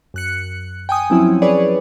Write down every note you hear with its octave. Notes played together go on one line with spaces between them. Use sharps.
F#2 F#6 C#7
G5 G#5 D#6
F3 F#3 C4 C#4 E4
G#4 B4 C#5 D5